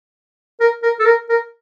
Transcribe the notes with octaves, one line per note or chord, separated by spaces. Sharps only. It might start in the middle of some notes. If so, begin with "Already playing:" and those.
A#4
A#4
A4
A#4
A#4